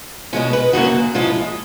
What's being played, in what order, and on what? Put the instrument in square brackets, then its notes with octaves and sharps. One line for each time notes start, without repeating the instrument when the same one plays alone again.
[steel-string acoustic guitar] B2 G#3 C#4 F4
B4
F#2 C#3 F#3 A#3 C#4 F#4
A2 F3 G#3 C#4 E4 F4